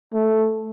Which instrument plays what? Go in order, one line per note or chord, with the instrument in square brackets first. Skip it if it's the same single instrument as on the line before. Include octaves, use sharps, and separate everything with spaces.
[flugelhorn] A3